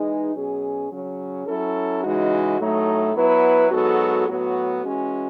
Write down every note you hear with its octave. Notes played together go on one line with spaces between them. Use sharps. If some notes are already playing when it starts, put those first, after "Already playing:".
Already playing: E3 G#3 D#4 G#4 B4
B2 F#3 C#4 G#4
C#3 F#3 C#4
F#3 C#4 E4 A4
C#3 E3 G#3 D#4 F#4
A2 F#3 A3 D#4
F#3 B3 E4 B4
G#2 F#3 B3 F#4 A4
A2 F#3 B3 F#4
E3 G#3 C#4 F#4